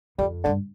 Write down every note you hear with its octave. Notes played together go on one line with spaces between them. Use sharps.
F2 G3
G2 D3